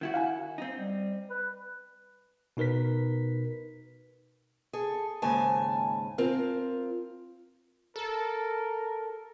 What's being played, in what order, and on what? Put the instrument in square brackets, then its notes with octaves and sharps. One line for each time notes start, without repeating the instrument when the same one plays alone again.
[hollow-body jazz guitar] D#3 E4 F#4
[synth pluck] F5 F#5 G#5
[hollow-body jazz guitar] C4 D#4
[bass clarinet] G3
B4
[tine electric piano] B2 D#4 A#4 B4 B6
[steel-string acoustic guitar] G#4 A4
D#2 G#2 C#3 G#5 A5
C4 F4 A#4
[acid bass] A4 [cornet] A#4